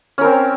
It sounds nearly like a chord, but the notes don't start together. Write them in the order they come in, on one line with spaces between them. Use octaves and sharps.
C#4 A#4 C4